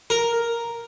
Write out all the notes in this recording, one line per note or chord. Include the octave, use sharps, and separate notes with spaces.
A#4